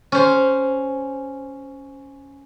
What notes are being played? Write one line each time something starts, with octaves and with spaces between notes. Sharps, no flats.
C#4 C5